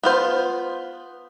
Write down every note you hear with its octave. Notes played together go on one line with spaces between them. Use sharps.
B3 F4 C5